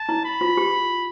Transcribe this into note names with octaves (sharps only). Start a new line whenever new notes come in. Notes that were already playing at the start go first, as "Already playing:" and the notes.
Already playing: A5
E4
B5
F4
G4